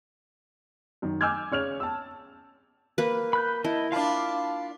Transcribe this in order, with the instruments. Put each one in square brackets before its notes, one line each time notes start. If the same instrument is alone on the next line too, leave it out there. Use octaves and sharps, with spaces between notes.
[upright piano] F#2 D#3
G#5 D6 E6 F6 G6 G#6
C#3 C#5 F6 F7
A5 E6
[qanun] A#3 B4
[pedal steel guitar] B5 F#6 G6
[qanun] E4 [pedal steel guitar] D#5 A5
[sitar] D4 F4 [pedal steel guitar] F5 A5 B5